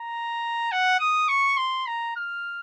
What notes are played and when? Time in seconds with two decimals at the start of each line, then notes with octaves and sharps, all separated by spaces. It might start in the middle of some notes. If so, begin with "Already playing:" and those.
Already playing: A#5
0.72 F#5
0.99 D#6
1.28 C#6
1.57 C6
1.87 A#5
2.16 F6